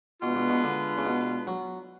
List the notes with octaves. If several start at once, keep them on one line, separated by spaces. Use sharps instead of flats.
B2 G#3 D4 F4 B4
B2
B2
D3
C#3
B2
F#3